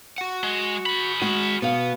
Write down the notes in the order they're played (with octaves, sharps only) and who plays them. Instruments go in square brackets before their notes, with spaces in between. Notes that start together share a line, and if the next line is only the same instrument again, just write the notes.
[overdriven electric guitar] F#4 F#5
[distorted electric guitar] G#3
G#4 B5
[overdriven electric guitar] G#3 [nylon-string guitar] F#4
[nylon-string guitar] B2 F5 [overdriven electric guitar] B3